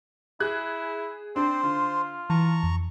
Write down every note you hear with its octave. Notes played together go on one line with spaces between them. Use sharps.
E4 G#4 F#6 G#6
C4 D4 C5
D3 F4
E3 A5 A#5 C#6
F2